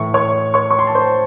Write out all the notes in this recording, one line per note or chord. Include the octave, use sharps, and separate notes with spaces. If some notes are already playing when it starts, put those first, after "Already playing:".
Already playing: A2 E3 C#6
C#5 C#6
C#5 C#6
C#6
C6
A5
C5 C6